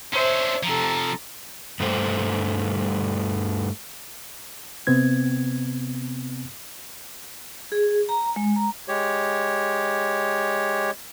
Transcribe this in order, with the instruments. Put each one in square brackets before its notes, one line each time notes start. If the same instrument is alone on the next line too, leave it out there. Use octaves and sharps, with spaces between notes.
[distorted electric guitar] C#4 D4 [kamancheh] C5 E5
[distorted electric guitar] C3 F3 [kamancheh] A4 A#5
[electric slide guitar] G2 G3 A3 C5
[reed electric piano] C3 B3 C4 G#6
[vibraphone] G#4
A#5
G#3
A#5
[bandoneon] G#3 G4 C#5